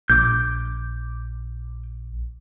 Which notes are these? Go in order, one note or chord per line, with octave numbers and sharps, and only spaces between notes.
A#1 D6 G6